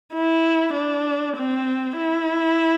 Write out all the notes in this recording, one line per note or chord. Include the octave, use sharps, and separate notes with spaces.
E4
D4
C4
E4